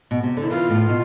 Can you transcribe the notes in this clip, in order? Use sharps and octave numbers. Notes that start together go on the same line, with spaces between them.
B2
C3
D3 E4
E3 F4
A2
B2